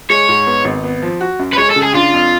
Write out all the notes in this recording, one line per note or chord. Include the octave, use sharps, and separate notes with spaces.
G#3 C#5
G#2
B3
G#1
B3
F3
F#4
F#2
B4
G#3 C#5
A4
C#3
G#4
D4 F4
F2